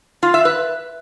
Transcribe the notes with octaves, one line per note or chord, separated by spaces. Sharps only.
F4
E5
B4